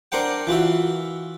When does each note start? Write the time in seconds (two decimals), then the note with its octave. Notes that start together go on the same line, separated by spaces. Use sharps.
0.12 D4 A#4 C5 F#5 G5
0.47 E3 F4 F#4 E5